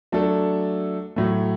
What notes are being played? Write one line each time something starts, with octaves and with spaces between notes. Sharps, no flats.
F#3 A3 D4 A4
A2 F#3 A3